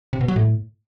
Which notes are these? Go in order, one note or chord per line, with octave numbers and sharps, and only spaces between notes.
C3
B2
F#3
A2